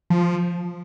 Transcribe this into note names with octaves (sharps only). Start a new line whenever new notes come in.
F3